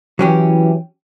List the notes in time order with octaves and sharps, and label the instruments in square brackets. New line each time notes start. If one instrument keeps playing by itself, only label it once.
[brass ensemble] E3 [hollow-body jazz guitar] F#3 C#4 G4